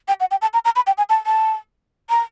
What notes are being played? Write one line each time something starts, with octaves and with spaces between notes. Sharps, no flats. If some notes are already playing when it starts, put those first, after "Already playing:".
G5
F#5
G5
A5
A#5
A#5
B5
G5
G#5
A5
A5
A#5